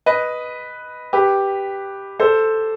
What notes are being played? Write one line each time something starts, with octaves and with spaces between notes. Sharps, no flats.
B4 D#5
G4 B4
A4 C5